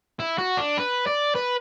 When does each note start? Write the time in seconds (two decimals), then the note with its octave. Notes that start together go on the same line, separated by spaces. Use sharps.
0.20 E4
0.38 F#4
0.57 D4
0.77 B4
1.07 D5
1.35 B4